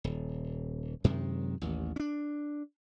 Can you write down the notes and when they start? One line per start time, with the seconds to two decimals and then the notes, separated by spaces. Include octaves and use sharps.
0.04 D#1
1.04 F#2 C3 D#3 G#3
1.61 A1 D#2
1.96 C#4 D4